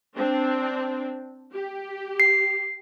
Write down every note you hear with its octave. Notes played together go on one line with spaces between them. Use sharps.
C4 D4
G4
C7